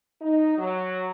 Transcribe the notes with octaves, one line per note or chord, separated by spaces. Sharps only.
D#4
F#3